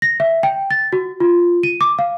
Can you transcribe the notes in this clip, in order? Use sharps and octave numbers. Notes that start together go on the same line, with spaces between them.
A#6
E5
G5
A6
F#4
F4
D#7
D6
F5